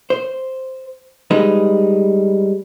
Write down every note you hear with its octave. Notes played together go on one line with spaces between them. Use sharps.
C5
G3 G#3 D#4 B4